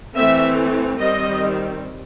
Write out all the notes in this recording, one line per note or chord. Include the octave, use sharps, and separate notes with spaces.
E3 A3 C4 E5
D#3 G3 C4 D#5